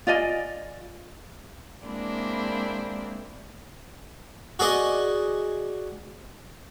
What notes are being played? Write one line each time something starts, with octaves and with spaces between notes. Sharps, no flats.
F4 D5 D#5 G#5
G#3 A#3 C4 D4 E4
F#4 G#4 D5 D#5